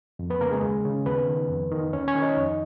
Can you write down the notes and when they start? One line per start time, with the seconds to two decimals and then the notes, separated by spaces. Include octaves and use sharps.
0.19 F2
0.30 B3 B4
0.41 C#3 A#3 A#4
0.52 G#3 G#4
0.63 D#2
0.85 C#3
1.06 D#2 B3 B4
1.28 D#3
1.49 F2
1.71 D#3
1.93 D#2 C#4 C#5
2.08 C#4 C#5
2.15 D#3
2.22 D#4 D#5
2.37 F2